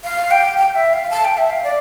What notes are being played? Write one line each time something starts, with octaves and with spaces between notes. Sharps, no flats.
F5
G5
G5
E5
F5
A5
G5
E5
F5
D5